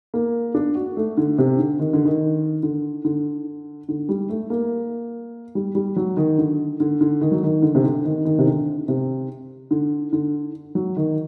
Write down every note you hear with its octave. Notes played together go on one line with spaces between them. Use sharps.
A#3
D4
F#4
A3
D3
C3
D3
D#3
D3
D#3
D3
D3
D3
G3
A3
A#3
G3
G3
F#3
D#3
D3
D3
D3
D#3
F#3
D#3
D3
C3
D3
D#3
D#3
C3
D3
C3
D3
D3
F#3
D#3